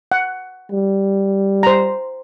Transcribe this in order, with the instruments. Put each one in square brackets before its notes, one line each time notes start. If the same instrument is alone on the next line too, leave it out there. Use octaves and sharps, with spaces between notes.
[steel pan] F#5
[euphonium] G3
[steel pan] C5 A#5